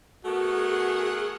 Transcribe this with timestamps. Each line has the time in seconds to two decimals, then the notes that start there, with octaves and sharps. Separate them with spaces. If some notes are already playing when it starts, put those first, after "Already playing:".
0.25 A3 B3 F#4 G#4 A#4 F#5